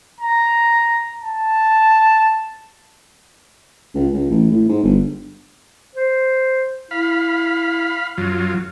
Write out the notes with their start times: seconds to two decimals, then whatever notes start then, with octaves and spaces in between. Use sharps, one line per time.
0.20 A#5
1.23 A5
3.95 C#2
4.14 C#2
4.30 A1
4.51 A2
4.69 G#2
4.83 G1
5.95 C5
6.91 E4 F5 B5
8.18 F#2 F#3 F4